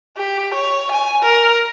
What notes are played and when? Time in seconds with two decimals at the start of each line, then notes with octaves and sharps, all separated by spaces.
0.18 G4
0.55 C#5
0.92 G#5
1.23 A#4